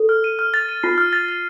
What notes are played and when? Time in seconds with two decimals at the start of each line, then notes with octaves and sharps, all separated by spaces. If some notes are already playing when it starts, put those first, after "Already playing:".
Already playing: A4
0.09 F6
0.24 D#7
0.39 F6
0.54 A6
0.69 D#7
0.83 F4 C7
0.98 F6
1.13 A6
1.28 A6